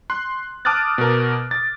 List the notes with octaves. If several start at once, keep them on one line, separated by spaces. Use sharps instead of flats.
C6 F#6
A5 D6 D#6 F6 F#6 A6
B2 A#4
A6